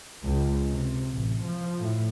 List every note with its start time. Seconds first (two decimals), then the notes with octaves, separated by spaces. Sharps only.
0.24 C#2
0.71 C3
1.12 A1
1.43 F3
1.79 A2